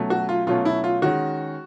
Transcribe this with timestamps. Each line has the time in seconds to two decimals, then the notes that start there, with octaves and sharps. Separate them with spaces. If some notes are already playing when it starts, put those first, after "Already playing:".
Already playing: B2 F#3 A3 C#4
0.10 F#4
0.29 F4
0.47 B2 F#3 A3 C#4 F4
0.65 E4
0.84 F4
1.02 D#3 G#3 C#4 F#4